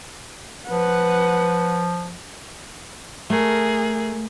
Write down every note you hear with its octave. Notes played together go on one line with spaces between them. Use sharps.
F3 B4 F#5
A3 G#4 A#4